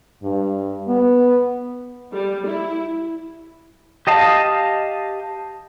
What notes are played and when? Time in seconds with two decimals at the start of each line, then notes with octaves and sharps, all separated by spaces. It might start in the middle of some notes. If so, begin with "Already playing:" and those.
0.23 G2
0.88 B3
2.13 G3
2.47 E4
4.07 G4 D#5 F5 A5